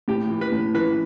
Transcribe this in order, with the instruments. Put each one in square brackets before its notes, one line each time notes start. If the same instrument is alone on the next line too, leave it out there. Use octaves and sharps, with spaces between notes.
[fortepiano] A2 G4
E3
B4
A2
E3 B4